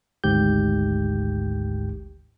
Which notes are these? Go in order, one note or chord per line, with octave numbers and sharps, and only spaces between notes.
G#1 D2 G#2 G4 G6